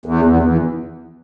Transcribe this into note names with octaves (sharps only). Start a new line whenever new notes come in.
E2
E2
E2